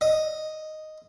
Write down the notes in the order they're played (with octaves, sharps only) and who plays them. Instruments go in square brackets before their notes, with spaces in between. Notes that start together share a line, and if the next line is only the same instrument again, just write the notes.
[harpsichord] D#5